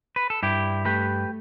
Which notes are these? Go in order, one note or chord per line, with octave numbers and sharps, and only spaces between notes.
B4
A4
G2 E4 G4
A3 G4 B4